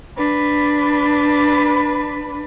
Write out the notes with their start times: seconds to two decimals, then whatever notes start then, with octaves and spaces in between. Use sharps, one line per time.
0.17 D4 B4